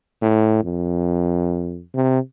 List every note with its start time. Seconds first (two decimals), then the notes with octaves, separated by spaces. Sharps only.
0.22 A2
0.64 F2
1.95 C3